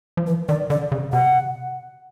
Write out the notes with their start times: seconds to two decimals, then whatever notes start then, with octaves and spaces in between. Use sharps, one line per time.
0.17 F3
0.27 E3 B4
0.49 D#3 D5
0.70 D3 D5
0.92 C#3
1.13 C3 F#5